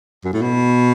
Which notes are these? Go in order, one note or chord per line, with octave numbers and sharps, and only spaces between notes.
F#2
A2
B2